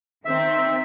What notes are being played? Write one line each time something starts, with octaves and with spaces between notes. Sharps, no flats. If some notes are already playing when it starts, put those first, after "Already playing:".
D#3 C4 E5